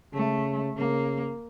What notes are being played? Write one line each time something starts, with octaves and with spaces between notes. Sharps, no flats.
C#3 A3
C#3 A#3